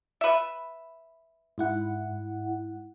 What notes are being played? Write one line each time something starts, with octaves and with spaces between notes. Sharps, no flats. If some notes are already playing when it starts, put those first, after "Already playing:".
B4 E5
G#2 E4 F#5